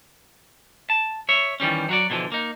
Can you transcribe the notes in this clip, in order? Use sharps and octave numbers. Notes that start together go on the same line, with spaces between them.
A5
C#5 E5
D#3 E3 G3 C#4
F#3 F#4 D5
B2 D3 E3 F3
A#3 D#4